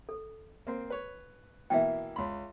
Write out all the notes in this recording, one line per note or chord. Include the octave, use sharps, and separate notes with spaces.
A4
A#3 C4
B4 C#5
B2 E3 A#3 E5 G5
C#2 B5 C6